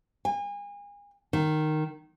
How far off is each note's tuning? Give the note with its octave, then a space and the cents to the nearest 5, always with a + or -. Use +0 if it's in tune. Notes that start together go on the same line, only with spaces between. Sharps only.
G#5 -35
D#3 -10